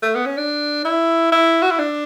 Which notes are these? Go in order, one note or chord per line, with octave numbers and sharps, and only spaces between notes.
A3
B3
C#4
D4
E4
E4
F#4
E4
D4